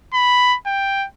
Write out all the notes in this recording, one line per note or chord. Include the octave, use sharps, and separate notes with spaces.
B5
G5